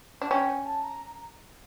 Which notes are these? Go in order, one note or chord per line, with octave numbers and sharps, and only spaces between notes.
D4
F#5
C#4 G5
G#5
A5
A#5